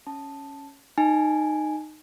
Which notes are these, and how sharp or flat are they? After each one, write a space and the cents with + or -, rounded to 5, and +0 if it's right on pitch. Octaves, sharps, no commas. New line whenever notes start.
C#4 +0 A5 +0
D#4 -15 G#5 +0